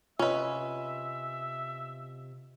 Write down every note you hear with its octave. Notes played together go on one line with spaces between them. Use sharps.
C3 C#4 F4 B4 D#5 E5